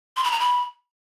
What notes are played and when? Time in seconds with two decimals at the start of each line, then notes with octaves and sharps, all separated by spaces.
0.17 C6
0.24 B5
0.32 A#5
0.40 B5